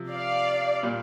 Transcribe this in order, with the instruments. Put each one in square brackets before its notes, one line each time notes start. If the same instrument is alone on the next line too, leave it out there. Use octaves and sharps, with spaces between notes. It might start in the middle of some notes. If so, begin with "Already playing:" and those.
Already playing: [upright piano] C3 F3
[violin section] D5 F5
[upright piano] A#2 G3